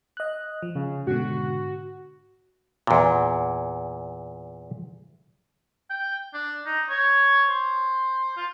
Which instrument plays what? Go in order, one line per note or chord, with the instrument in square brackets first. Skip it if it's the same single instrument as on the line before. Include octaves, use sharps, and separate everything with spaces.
[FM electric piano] D#5 F#6
F3
[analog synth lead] C#3
[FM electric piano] G#2 B2 D3 [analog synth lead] F#4
[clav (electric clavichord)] E2 A#2
[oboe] G5
D4
D#4
C#5
C5
F4